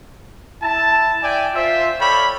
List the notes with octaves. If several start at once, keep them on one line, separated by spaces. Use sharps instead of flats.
E4 A5
D5 E5 G5 G#5
F4 C5 E5
A4 C#5 D5 F5 G5 B5